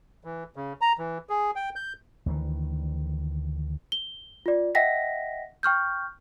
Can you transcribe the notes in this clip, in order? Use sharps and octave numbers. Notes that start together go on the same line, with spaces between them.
E3
C#3
A#5
E3
G#4
G5
G6
D2 D#3 E3
G7
F4 D5
D#5 E5 F#5 G5 A#6 B6
G5 C#6 F6 G6